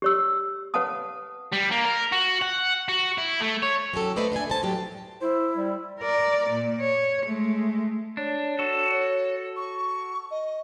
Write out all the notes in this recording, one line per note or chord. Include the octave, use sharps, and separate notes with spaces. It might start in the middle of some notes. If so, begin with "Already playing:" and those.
G4 C#5 E6
B4 C#5 F5 F#5 A5 D#6
G3
A#3
A#4
F#4
F#5
F#4
E4
A3
C#5
F#3 C#4 G4 A4 C#5
A3 B4 C5 D5 D#5
D4 A4 D5 G#5
C5 A5
A2 D3 F#3 G4 A4
E4 C5
G3
A#4 D5
A#2
C#5
G#3 A3
D4 C#5
F#4 A4
C#5
C#6
D#5